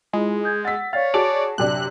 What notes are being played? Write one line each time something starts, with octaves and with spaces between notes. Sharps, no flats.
G#3 E4 F4
D#6 G6 G#6
F#5 E6 A6 B6
C#5 D5 F5 A6
F#4 G#4 D5 A5 F7
F#2 C3 D4 F#6